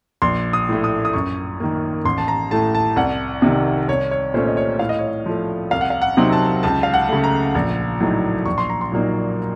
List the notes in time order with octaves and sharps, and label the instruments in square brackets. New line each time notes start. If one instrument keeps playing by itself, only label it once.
[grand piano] A#1 C6
D#6
A2 A3
D#6
D#6
F#2 C#6
D#3 A#3
A1 C6
A5
A#5
A2 A3 A5
A5
C2 F#5
C3 D#3
C2 C#5
C#5
A#2 A3 C#4 C5
D#5
C#5
A2 F5
D#5
C#5
D#5
F3 A3
C2 F5
F#5
F5
F#5
C3 F#3 C4 D#4
A5
C#2 A5
F5
F#5
C#3 A3
A#5
A#1
A2 F#3 A3 D#4
A#1 C#6
C6
A#5
C6
A#2 F#3 A#3 D#4